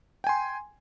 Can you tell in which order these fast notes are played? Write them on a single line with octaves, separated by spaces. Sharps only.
G5 G#5 C6